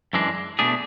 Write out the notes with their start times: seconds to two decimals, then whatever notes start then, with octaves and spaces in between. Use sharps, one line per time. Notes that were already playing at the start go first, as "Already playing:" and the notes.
0.13 F#2 E3 G#3 D4
0.59 B2 A3 D4 G#4